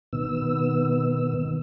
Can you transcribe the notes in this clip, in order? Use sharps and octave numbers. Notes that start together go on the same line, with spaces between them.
B2 D#3 B3 E6